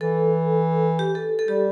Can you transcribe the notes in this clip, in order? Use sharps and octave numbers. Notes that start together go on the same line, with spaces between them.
E3 A4
G4
A4
A4
G3 G4